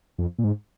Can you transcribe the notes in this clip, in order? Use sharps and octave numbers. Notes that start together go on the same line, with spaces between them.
F2
A#2
G#2